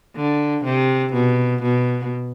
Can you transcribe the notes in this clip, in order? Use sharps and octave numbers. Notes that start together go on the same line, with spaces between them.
D3
C3
B2
B2